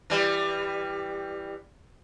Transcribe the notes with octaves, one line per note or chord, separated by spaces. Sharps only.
E3 G3